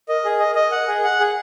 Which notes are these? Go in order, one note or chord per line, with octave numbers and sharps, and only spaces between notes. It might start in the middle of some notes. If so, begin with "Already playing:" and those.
A#4 D#5
G#4
D#5
D#5
F#5
G#4
F#5
G#4